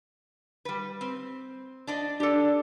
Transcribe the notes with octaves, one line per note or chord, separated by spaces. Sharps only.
G3 B4
C4
D4 D5 D#5
D4 G4 A4